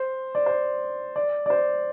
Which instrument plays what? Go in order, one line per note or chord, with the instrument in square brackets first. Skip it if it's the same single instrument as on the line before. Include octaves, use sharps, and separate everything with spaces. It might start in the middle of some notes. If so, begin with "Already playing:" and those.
Already playing: [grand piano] C5
D5
C5
D5
D5
C5